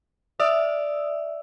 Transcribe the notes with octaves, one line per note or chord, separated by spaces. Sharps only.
D5 E5 D#6 E6